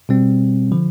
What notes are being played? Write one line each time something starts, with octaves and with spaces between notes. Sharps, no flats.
B2 G3 C4
D3 F3